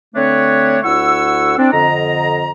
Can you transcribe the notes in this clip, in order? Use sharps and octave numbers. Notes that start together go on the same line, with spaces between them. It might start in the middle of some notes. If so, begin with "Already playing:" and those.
D3 A3 C4 D4 B4 C#5
D2 E4 F#5 C#6 E6
C4 D4
F2 D3 D#5 A#5